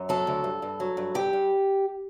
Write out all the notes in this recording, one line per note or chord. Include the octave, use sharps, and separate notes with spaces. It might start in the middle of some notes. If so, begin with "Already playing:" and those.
Already playing: F#2
F#3 A4
D2
G2
G2
F#3
G2
G2 G4
G2